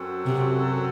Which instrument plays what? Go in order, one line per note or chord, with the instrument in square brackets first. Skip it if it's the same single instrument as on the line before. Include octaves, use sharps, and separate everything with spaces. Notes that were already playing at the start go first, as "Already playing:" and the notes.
Already playing: [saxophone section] F#2 F#3 C4 F#4 A4
[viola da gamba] C3